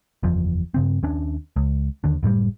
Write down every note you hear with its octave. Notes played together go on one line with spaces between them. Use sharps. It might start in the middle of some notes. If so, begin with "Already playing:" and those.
F#1 E2 F3
G2 C#3 C4
D#2 C#4 D4
C#2
D#2 D3
F#1 A2 C3 G3